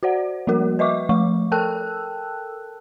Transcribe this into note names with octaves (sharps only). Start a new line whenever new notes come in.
F#4 C5 D5 F#5
F3 G3 A#3 F#4 A#4
B4 D#5 E5 C#6 D6
F3 A3 C#6
A4 A#4 G5 A5 E6 F#6